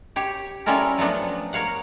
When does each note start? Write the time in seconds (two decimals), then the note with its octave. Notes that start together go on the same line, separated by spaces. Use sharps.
0.16 G4 C#5
0.66 G3 C#4 E4 F4 A4 A#4
0.98 F3 F#3 A3 B3 D4
1.53 A#4 C#5 F5 F#5